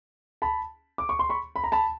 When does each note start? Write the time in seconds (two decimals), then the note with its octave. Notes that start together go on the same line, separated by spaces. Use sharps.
0.42 A5 B5
0.98 D6
1.09 C#6
1.19 C6
1.29 B5 C#6
1.56 B5
1.64 A#5
1.72 A5 B5